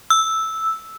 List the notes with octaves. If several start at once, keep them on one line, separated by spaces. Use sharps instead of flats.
E6